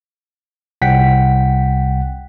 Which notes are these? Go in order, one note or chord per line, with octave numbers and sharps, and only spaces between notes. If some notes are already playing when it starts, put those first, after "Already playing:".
C2 F#5 G5 B6